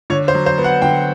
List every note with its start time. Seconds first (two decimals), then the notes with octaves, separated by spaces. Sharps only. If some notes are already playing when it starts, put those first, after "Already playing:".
0.10 D3 C#5
0.28 C5
0.34 F#3
0.46 C5
0.58 B3
0.64 F#5
0.82 D3 G5